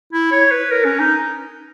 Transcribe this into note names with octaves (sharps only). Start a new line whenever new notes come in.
E4
C#5
B4
A#4
C#4
D#4